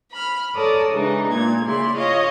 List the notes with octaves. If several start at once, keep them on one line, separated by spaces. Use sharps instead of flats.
B5 F6
A4 A#4 C#5 D5 A5 D#6
C#3 E3 G#3 D4 D#4
A#2 G#6
C#3 A#3 E4 D5 C6
F4 C#5 D#5 F5